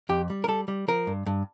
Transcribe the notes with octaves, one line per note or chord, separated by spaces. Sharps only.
F2 G4
G3
A#4
G3 A4
G3
F3 A#4
G2
G2